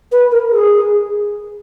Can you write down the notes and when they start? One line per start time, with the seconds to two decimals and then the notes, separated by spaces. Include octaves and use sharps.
0.12 B4
0.32 A#4
0.51 G#4